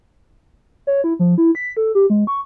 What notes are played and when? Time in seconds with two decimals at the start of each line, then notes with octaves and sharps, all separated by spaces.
0.87 C#5
1.04 E4
1.19 F3
1.38 E4
1.55 B6
1.77 A4
1.95 G4
2.10 G#3
2.27 C#6